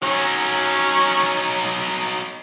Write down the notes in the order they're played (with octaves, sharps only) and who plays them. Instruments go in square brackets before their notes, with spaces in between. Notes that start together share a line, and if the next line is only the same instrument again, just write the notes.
[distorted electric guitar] F#3 D#4 [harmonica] C#4